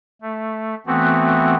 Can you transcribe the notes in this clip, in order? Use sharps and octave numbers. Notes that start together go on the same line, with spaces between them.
A3
E3 A3 B3 C4 F#4